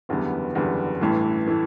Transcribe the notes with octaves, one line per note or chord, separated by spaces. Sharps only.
F#1 E2 D3 G3 B3
F#1 E2 D3 G3 B3
A1 G2 E3 A3 E4
E3 A3 E4